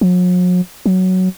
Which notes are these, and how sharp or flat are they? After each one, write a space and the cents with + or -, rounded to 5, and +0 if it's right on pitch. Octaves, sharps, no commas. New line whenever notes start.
F#3 -45
F#3 +5